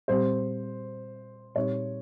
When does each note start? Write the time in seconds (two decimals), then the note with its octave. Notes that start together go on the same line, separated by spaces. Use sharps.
0.08 A#2 G3 C4 G4 C5
1.55 A#2 G3 C4 D#4 G4 C#5